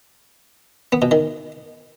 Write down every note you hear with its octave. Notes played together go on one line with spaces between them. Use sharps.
B3
B2
D#3